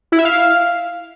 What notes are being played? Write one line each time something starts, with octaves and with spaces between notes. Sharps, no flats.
E4
E5
F5